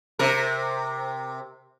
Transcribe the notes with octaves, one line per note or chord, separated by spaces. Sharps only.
C3 A#4